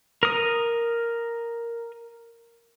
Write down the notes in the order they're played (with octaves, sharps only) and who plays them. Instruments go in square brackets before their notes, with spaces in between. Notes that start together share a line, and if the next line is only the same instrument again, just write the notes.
[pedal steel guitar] A#4 D#6